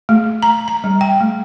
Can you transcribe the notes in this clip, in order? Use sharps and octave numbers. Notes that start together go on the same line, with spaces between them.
A3
A#5
A#5
G3
G5
A3